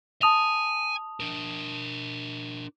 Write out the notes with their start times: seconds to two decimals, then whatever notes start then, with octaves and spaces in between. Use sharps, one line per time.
0.22 G#5 A5 D#6 F7
1.20 D4 A#4